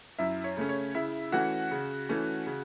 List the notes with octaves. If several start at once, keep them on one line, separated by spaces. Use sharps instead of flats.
F#2 E4 E5
C#5
C#3 A3 C#4
C#5
C#3 E4 E5
E3 A3 C#4 F#4 F#5
C#3
E3 A3 C#4
C#3